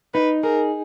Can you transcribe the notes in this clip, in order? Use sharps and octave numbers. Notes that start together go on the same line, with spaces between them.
D#4 B4
G#4 A#4